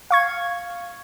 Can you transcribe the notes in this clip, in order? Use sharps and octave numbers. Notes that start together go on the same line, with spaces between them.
F5 C#6 G#6